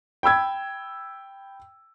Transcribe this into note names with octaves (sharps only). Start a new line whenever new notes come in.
G5 B5 E6 G#6